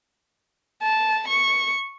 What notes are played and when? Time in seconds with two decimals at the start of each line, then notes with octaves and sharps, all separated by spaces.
0.83 A5
1.28 C#6